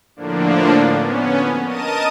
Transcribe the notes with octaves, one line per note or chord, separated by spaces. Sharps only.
A2 D3 F3 A#3 D4
B3 C#4
A#4 D#5 A5 D#6 D#7